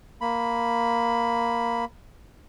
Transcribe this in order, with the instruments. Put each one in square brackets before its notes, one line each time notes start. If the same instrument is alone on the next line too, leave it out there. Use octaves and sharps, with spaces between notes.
[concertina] A#3 B5